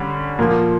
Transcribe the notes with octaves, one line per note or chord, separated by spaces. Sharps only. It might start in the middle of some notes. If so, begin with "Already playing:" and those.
Already playing: D3 G3 C#4
A#2 F3 A#3